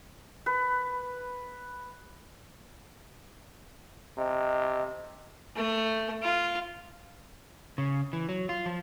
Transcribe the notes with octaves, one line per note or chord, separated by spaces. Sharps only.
B4
C3 D#5
A3
F4
C#3
E3
F#3
F4
F3